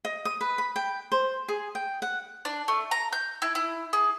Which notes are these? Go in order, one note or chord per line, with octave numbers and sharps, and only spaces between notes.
D#5
D#6
B4
B5
G5
C5
G#4
G5
F#5
D4
A3
A#5
G6
E4
E4
G#4